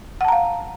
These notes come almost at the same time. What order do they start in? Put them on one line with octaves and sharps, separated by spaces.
F#5 A5 A#5 F5